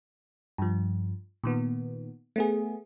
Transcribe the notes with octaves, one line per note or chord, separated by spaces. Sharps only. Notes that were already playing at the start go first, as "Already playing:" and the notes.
G2 F3
A#2 D#3 B3
A3 B3 G#4